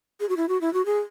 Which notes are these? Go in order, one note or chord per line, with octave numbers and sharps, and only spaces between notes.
G#4
F#4
E4
F#4
E4
F#4
G#4